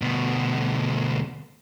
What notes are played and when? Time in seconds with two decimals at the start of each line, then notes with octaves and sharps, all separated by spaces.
0.02 D2 B2